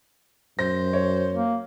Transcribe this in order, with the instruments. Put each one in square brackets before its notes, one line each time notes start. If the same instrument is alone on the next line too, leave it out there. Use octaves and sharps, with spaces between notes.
[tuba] F#2 [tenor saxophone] C5 [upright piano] A#6
[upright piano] C#5
[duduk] A#3